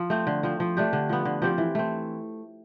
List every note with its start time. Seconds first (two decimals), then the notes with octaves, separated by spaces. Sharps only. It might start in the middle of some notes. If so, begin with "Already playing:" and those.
Already playing: F3
0.10 A3 C4
0.27 D3
0.43 F3 C4
0.60 F3
0.77 A3 D4 G4
0.93 D3
1.09 F3 B3
1.25 D3
1.42 F3 C4 G4
1.58 E3
1.75 A3 C4